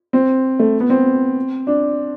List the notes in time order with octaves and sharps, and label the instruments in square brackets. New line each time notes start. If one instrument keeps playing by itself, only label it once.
[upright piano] C4
A3
B3
C4
D4